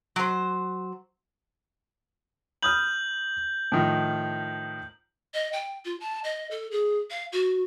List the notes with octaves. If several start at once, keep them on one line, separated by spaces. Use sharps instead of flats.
F#3 C5
B5 D#6 F6 G6 F#7
A2 D#3 F3
D#5
G5
F4
A5
D#5
A4
G#4
F5
F#4